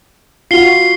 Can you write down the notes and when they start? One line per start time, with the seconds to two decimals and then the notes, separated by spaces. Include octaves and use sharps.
0.51 F4 F#4 C7 G7